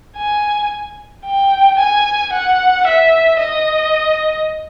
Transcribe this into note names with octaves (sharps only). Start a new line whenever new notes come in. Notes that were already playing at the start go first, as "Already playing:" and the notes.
G#5
G5
G#5
F#5
E5
D#5